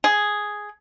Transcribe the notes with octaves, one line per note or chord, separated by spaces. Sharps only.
G#4